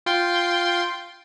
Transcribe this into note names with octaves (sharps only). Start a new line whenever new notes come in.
F4 G5 C6